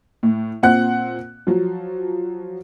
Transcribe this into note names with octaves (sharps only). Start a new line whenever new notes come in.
A2
A#2 C4 F#5 F#6
F3 F#3